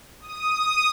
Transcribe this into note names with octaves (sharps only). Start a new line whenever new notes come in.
D#6